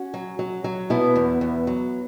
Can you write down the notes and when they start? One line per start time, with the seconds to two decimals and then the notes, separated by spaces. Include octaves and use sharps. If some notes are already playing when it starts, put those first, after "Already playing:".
Already playing: C#4 F#4
0.14 F#3
0.39 F#3
0.64 F#3
0.90 B2 B3 E4
1.16 E2
1.41 E2
1.67 F#3